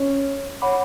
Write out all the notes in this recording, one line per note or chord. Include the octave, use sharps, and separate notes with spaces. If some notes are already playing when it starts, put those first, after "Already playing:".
Already playing: C#4
C#5 F#5 B5 D6